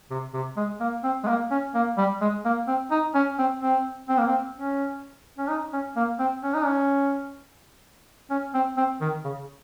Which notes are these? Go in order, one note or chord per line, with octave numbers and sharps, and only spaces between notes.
C3
C3
G#3
A#3
C4
G#3
A#3
C#4
A#3
G3
G#3
A#3
C4
D#4
C#4
C4
C4
C4
A#3
C4
C#4
C#4
D#4
C#4
A#3
C4
C#4
D#4
C#4
C#4
C4
C4
D#3
C#3